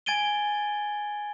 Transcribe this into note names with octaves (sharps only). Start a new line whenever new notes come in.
G#5 G#6 A6 D7 D#7 G7